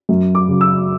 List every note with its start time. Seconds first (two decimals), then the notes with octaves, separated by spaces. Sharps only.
0.09 F#2
0.35 D6
0.48 C#3 F#3
0.61 E6